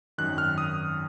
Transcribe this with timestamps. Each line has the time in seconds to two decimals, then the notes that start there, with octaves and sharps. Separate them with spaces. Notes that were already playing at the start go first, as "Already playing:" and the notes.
0.18 G#1 F#2 D#3 F#6
0.38 F6
0.58 D#6